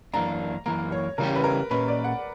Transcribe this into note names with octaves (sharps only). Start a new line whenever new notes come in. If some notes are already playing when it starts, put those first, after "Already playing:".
F#2 E3 A#3 D4 A#5
F#2 E3 A#3 A#5
C#5
C#3 E3 G3 C#4 G4 A#4
B4
A#4
A#2 A#3 C#4 B4
D5
F#5